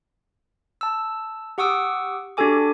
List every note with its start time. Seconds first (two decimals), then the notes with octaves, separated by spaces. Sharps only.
0.81 A5 E6
1.58 G4 F#5 C#6 D#6 E6 D7
2.37 D4 F#4 G4 A4 G#5 D6